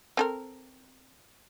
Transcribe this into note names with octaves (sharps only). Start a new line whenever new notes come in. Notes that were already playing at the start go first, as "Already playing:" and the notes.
C4 A4 A#4